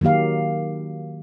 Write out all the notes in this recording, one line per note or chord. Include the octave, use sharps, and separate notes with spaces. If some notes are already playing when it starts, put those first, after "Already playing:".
D#3 F#3 A#3 G4 F5